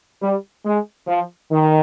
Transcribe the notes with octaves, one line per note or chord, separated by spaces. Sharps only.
G3
G#3
F3
D#3